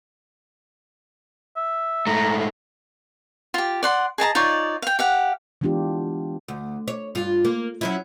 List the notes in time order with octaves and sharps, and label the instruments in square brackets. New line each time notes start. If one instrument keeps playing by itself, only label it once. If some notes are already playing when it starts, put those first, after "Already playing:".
[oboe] E5
[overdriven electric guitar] G#2 A3 [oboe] A#5
[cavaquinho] F4 G4
D5 F#5 C6
G#4 D#5 A5 A#5
D#4 F4 C#5 D5
F5 G5
G4 F5 F#5
[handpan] E3 G#3 B3 D4 F4 G4
[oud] D2
C#5
G2 F4
A#3
F#3 C#4 E4